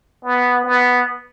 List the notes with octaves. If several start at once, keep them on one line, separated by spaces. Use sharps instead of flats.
B3
B3